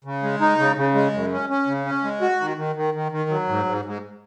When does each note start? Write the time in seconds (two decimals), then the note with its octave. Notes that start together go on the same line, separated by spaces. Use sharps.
0.05 C#3
0.23 G#3
0.41 D#4
0.58 C#3
0.77 C#3
0.95 G#3
1.13 F#2
1.32 C#4
1.50 C#4
1.67 C#3
1.86 C#4
2.04 G#3
2.21 F#4
2.40 D#3
2.57 D#3
2.76 D#3
2.94 D#3
3.12 D#3
3.30 F#3
3.49 G#2
3.66 G#2
3.85 G#2